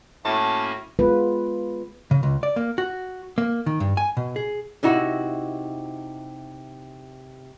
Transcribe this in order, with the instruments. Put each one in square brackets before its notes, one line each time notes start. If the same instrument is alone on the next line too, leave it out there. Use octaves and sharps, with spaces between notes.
[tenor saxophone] A2 [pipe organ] A#3 C#4 F#4 [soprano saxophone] A5
[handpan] G#3 B3 F4 B4
[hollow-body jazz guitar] C#3
C#2
D5
A#3
F#4
A#3
D#3
G2
G#5
B2
G#4
[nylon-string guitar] C3 D#4 E4 F#4